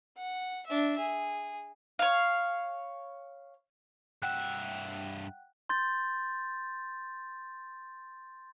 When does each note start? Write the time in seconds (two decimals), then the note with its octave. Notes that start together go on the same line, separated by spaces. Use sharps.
0.17 F#5
0.66 D4 E5
0.99 G#4
1.99 C#5 F5
4.22 G2 E5 F#5 G5 F#6
5.69 C6 G6 A6